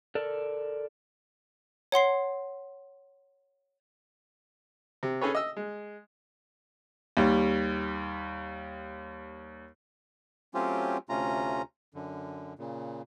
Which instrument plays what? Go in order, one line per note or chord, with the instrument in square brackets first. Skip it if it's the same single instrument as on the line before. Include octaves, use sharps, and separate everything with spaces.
[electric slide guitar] A4 A#4 D5
[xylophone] C#5 F#5 C6 C7
[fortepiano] C3
C#4 G#4 A4 B4 C#5
D#5 E6
G#3
[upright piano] D#2 G3
[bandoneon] F#3 A3 C4 C#4 F4 G4
D2 C3 A3 C#4 F4 A#5
F#2 D3
A#2 C#3